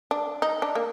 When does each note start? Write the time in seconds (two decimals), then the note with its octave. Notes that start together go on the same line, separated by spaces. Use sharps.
0.11 D4
0.42 D#4
0.62 D4
0.75 A#3